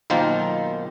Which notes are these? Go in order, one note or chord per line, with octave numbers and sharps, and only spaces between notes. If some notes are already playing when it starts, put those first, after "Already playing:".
B1 D#3 A#3 F4 C5